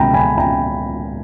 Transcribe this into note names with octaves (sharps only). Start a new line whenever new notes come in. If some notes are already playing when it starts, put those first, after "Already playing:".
Already playing: C#2 B2 G#3 G5 A#5 B5
G#5 B5
G5 A#5